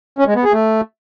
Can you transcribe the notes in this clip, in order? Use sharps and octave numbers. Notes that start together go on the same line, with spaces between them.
C#4
G#3
B3
G#4
A3